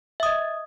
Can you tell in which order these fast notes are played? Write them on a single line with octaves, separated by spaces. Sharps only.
E5 D#6 D#5